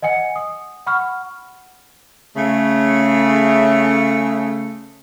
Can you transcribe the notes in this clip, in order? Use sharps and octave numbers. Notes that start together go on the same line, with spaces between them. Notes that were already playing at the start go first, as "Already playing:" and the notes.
D#5 F#5 G#5 C#7
D#6
F#5 B5 C#6 F6
C#3 A3